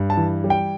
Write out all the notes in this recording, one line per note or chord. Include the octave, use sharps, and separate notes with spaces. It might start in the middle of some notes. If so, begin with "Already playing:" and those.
Already playing: G2
A5
E3
G3
G5